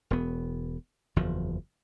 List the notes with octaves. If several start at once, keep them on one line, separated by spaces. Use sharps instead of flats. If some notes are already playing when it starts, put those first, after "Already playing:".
E1 B3
F#1 E2 F3